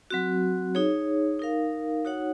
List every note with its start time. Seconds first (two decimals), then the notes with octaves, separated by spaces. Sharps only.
0.11 F#3 C4 F#4
0.75 D#4 G#4 C#5
1.40 D#4 A#4 F5
2.05 D#4 F#4 C#5 F#5